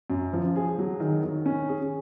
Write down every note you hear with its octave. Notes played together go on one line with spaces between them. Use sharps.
F#2
F3
G#4
F#3
D#3
D#3
C#4
G#4